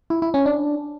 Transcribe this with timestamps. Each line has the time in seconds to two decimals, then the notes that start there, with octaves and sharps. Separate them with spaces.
0.10 E4
0.22 E4
0.34 C#4
0.46 D4